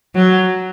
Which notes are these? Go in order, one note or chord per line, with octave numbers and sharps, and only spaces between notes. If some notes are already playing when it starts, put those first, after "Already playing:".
F#3